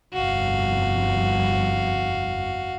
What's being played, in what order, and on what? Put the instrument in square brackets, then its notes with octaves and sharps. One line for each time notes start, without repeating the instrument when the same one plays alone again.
[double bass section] G1 C2 F2 [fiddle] F#4 F5